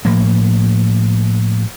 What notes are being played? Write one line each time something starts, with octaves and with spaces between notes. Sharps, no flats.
A2 F3 A#3